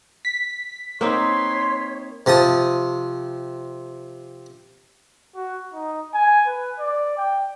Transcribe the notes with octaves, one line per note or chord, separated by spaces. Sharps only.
B6
A#3 C4 D#4 B4 C#5 C6
C3 F3 A5 D#6
F#4
D#4
G#5
B4
D5
G5